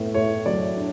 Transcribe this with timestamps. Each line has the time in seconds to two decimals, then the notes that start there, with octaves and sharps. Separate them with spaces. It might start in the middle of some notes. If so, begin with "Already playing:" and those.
Already playing: A2 B3
0.14 A2 C#5
0.46 F#3 D5
0.77 D4